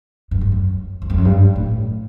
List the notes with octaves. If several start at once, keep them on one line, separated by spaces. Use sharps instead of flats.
G2
F#2
F#2
E2
F2
F#2
G2
A2